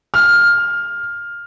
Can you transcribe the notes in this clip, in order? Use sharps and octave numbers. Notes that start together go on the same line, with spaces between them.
F6